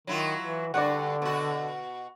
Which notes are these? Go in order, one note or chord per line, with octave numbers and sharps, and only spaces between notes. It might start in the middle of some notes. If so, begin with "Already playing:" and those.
D#3 F#3 E4 F4
E3
G2 D3 F#4 D5 F#5
B2 F#4